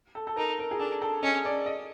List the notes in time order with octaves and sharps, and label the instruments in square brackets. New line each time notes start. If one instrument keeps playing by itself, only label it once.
[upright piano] A4
A4
[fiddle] D#4 [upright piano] A#4
[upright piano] A#4
G#4
[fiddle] D4 [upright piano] A4
[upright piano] A4
[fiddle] C#4 [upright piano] D#5
[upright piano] D5
D#5